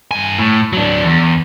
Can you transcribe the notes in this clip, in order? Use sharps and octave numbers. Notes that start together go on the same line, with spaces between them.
G2 G#5
A2
F#3 D4
E2